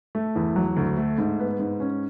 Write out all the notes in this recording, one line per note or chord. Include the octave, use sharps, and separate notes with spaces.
A3
E2
F#3
D2
A3
G#2
B3
G#2
C#4